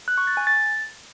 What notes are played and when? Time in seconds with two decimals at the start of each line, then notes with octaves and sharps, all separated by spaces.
0.08 F#6
0.18 C#6
0.27 A6
0.37 G#5
0.47 A6